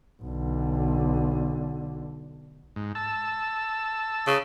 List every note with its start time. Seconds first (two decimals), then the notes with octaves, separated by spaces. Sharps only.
0.22 B1 D3
2.76 G#2
2.95 A5 E6
4.27 C#3